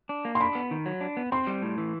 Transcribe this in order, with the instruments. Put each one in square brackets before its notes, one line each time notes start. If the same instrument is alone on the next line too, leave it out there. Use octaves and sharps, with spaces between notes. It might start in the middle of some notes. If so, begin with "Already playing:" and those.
[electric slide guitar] D4
A#3
[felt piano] C6
[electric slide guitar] D4 [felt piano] B5
[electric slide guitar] B3
D#3
F#3
D4
B3
[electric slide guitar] C4 [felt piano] C6
[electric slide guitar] G3
A2
E3